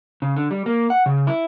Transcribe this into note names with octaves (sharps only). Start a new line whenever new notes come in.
C#3
D3
G3
A#3
F#5
C#3
E4